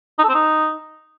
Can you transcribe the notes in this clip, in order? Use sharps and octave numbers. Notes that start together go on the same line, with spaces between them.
D#4
A4
C4
D#4